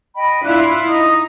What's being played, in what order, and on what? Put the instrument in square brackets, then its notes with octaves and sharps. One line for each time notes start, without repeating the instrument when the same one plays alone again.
[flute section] D#5 G5 B5
[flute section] D4 F#6 [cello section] E4 F4
[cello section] D#4 [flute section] D#5 A#5 D#6